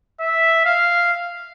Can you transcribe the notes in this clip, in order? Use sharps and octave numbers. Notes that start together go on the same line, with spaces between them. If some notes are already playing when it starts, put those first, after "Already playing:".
E5
F5